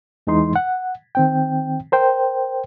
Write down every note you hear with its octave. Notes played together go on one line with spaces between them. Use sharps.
E2 E3 G#3 D#4 C6
F#5
D#3 C4 G5
A#4 C5 G5